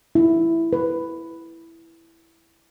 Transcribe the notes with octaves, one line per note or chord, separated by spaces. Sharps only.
E4
B4